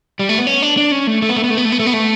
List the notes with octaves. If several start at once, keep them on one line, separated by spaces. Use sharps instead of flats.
G3
A3
B3
C#4
D4
D4
C#4
A3
A3
B3
A3
B3
A3
B3
A3
B3
A3
B3
A3